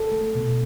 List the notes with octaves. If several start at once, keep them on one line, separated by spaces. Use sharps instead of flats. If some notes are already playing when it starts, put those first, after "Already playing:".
Already playing: A4
A3
B2